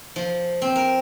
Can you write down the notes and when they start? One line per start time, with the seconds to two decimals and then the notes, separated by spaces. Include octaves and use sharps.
0.16 F3
0.62 C4
0.76 A#4